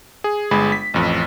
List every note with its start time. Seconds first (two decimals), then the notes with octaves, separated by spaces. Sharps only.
0.24 G#4
0.51 G1 G#3 B5
0.72 B6
0.94 A1 F2